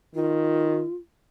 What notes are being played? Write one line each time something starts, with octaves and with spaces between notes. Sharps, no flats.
D#3 F4